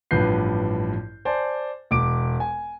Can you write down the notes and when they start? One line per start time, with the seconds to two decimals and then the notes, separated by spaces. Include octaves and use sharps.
0.11 A1 G2 F3 B4 G6 C7
1.25 C5 D5 G#5 A5
1.91 E1 D6 D7
2.40 G#5